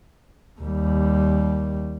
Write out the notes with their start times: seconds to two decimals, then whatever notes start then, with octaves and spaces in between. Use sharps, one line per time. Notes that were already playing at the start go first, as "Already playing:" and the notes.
0.61 D#2 G3